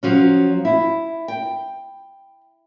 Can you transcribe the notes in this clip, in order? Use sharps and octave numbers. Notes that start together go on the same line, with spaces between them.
F3 F#3 C#4
E4
G5